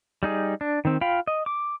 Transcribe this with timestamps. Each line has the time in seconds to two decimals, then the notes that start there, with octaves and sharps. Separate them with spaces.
0.23 G3 D#4 G#4
0.61 D4
0.85 D#3 C4
1.01 F4 F5 G5 B5
1.27 D#5
1.46 D6